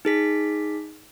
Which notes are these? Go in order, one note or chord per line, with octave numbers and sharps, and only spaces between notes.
D#4 G#4 B6